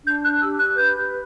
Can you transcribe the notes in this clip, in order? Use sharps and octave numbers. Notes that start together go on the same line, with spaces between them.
D4 G6
F#6
G4 E6
F#6
B4 G6